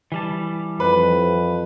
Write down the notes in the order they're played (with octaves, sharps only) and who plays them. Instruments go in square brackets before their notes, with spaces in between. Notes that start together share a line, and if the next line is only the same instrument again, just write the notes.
[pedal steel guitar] E3 G3 A5
[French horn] F2 [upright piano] B4